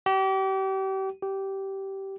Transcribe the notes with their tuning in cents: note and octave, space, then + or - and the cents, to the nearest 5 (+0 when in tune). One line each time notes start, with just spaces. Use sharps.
G4 -35
G4 -15